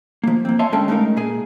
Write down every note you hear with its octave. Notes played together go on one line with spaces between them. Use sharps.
F3 A#3
A#3 C4
C#5 E5 F5 G#5 A5 C6
D3 G#3 C#4 A4 G5 A5
G#3 A3 C#4 D#4 A#4 F5
A#2 G#4 G#5